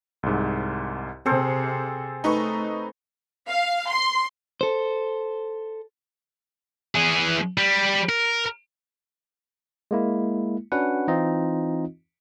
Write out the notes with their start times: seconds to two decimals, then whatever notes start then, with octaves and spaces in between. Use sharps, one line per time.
0.23 C2 G#2
1.26 C3 C4 G#4 A4 C5
2.24 A3 D#4 B4 C#6
3.47 F5
3.89 C6
4.61 A4 C5
6.95 E3 G#4
7.58 G3
8.09 A#4
9.91 G#3 A#3 E4
10.72 C#4 D4 F#4 B4 F#5
11.08 E3 C4 D#4 F4 D#5